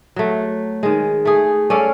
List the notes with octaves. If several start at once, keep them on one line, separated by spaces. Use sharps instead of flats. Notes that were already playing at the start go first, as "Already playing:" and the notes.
F#3 A3
D#3 G#3
A3 G#4
C#4 A4 D5 F5